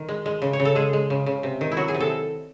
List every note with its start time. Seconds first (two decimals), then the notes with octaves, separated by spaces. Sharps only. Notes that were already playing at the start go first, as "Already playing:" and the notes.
Already playing: D#3
0.09 G#3
0.26 G#3
0.42 C#3
0.53 C#5
0.60 C#3
0.65 A4
0.75 G#3 G#4
0.93 G#3
1.10 C#3
1.26 C#3
1.43 C3
1.61 D#3
1.72 E4
1.77 F#3 F#4
1.88 G#4
1.95 C3
2.00 A4